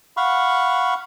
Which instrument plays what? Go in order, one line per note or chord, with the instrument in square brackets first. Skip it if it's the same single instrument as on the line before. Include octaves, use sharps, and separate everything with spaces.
[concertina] F5 F#5 B5 C#6